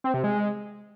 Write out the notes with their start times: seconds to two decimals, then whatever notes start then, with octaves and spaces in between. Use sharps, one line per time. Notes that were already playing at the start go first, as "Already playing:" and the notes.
0.04 C4
0.14 C3
0.24 G#3